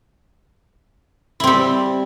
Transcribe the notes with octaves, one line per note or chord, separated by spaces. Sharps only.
G3 C4 E4